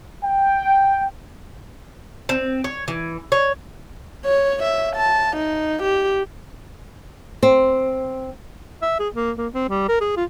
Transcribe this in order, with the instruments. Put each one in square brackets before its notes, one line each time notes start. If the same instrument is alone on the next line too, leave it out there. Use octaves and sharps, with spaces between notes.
[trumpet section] G5
[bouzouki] C4
C#5
E3
C#5
[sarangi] C#5
E5
A5
D#4
G4
[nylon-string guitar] C4
[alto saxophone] E5
G#4
A#3
A#3
C4
G3
A#4
G#4
F4